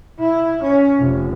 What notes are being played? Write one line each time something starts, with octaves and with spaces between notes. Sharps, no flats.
E4
C#4
F1